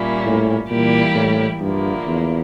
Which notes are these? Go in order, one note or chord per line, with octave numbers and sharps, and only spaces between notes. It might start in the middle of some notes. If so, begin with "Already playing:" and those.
Already playing: A#2 G3 A#3 C#4 E4
A2
A#2 E3 G3 A#3 E4 G4
A2
G2 D3 F3 A#3 E4
E2